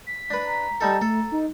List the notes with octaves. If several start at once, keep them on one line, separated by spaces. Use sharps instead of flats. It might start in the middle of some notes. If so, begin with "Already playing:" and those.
B6
D4 B4
A#5
G3 D#4 A4 A5
A3 A4
D#4